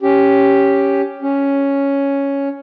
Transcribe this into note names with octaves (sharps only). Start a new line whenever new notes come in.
C#4 G4
C#4